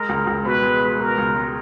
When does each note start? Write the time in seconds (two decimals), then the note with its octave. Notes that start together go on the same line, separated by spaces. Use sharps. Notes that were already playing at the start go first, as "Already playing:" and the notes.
Already playing: G#3 A#4
0.09 C#2
0.27 C#2
0.45 B2 B4
0.63 G#3
0.81 G#3
0.99 B2 A#4
1.18 C#2
1.35 G#3